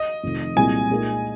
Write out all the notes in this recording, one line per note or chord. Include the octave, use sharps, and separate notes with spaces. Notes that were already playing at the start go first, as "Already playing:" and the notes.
Already playing: D#5
F1 F2 D#3
C2 A#2 G#3 C4 G#5
A#2 G#3 D#4 A#4